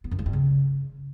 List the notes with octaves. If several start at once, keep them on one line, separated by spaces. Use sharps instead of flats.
B3
F#2
A3
G2
C#3